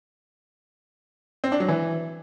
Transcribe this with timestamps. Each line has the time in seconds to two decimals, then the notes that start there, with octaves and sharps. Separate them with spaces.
1.44 C4
1.52 D4
1.60 F#3
1.68 E3